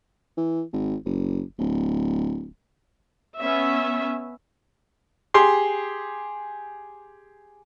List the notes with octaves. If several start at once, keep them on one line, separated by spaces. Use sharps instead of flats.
E3
G#1
F#1
D1
B3 C#4 E5
G4 G#4 C6